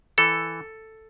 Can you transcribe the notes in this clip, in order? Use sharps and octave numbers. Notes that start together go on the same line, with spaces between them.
E3 A4